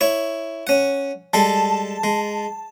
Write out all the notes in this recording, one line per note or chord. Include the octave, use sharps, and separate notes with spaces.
E4 C#5
C#4 F#5
G3 G#3 A4 A5
G#3